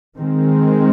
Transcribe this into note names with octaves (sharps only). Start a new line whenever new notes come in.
D#3 G#3 C4